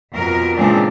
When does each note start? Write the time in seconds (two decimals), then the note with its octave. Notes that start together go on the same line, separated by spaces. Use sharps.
0.13 F2 B2 A#4
0.55 A#2 C#3 E3 G#3 C4 D4